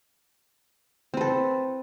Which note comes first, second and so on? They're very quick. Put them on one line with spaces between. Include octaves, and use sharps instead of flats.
C4 B4 A4